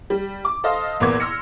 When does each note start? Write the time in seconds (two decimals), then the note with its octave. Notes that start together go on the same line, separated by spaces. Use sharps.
0.10 G3
0.45 D6
0.64 A4 C5 D#5 F5
1.00 E2 A#2 A#3 B3 D6 G#6
1.20 C6 E6 F6 A#6 C#7